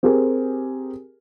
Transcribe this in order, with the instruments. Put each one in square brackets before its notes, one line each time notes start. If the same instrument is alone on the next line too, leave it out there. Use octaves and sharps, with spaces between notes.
[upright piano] C4 G4 G#4 A#4